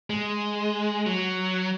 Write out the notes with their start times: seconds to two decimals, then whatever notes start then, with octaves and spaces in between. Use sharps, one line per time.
0.10 G#3
1.06 F#3